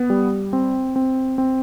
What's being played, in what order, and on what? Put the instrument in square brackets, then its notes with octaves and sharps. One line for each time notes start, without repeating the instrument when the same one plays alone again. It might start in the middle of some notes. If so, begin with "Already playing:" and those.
Already playing: [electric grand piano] B3
G3
C4
C4
C4